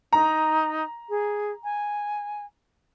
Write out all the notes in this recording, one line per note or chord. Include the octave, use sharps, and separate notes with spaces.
D#4 A#5
G#4
G#5